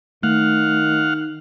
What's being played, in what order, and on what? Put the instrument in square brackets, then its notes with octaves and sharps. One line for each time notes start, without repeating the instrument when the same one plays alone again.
[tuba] D#3 [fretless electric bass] A3 [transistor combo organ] F5 F#5